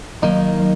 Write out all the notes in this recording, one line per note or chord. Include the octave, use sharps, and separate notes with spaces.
D#3 F#3 A#3 D#4
F#3